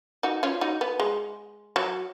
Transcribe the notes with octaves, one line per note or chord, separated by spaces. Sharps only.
D#4 F#4
C#4 F4
D#4 F#4
B3
G#3
F#3